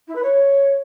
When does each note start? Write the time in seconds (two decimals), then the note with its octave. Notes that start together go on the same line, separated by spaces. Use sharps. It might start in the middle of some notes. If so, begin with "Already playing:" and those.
0.07 E4
0.15 B4
0.23 C#5